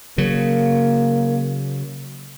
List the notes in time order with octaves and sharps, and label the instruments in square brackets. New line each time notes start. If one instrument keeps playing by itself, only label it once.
[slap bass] C#3 F#3 [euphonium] A#3